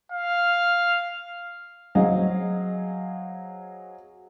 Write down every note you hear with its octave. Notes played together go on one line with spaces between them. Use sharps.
F5
F#3 C4 G#4 D#5 F5